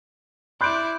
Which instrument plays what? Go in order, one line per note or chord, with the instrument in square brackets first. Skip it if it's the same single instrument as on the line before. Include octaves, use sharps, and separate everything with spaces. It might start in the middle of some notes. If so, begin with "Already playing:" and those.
[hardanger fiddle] E4 D5 [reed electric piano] B5 F#6 G6 [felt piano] C6 D7